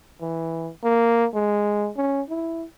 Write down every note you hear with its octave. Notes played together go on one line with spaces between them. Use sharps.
E3
A#3
G#3
C#4
E4